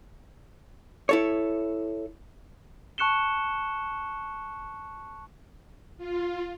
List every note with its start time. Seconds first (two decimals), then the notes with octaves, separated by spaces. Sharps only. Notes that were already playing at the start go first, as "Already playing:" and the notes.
1.09 E4 A4 C#5
2.98 A5 C#6 F#6 C#7 E7 G7
5.98 F4